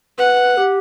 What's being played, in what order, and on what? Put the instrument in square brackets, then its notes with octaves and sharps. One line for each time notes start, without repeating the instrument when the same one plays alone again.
[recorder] B4 [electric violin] F#5
[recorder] G4